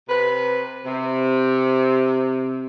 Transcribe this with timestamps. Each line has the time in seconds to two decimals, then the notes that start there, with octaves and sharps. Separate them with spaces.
0.08 C3 B4
0.85 C3